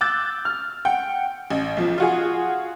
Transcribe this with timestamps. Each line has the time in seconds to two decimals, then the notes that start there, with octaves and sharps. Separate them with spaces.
0.01 D6 E6 F#6 G6 A6
0.45 F6
0.85 F#5 G5
1.50 A1
1.77 B1 F3
1.98 F4 F#4 G#4